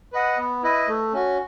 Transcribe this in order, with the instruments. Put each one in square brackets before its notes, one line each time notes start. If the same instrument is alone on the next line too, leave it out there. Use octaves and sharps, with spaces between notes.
[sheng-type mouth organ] B4 D#5 F#5
B3
E4 B4 D#5
A3
C#4 F#4